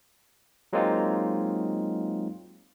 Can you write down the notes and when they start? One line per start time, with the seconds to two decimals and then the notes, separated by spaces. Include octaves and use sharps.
0.73 F#3 G#3 A#3 C4 D#4 F4